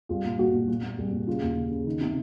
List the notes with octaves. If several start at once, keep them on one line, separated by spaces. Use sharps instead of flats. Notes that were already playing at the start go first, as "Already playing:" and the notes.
C2 F4
A#2
A#2 F#4
A#2
A#2
A#2
C2
A#2
C#3 F4
D#2
C#3
C#3
D#3
C3